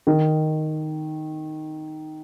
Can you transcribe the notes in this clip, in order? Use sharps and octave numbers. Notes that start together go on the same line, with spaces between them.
D#3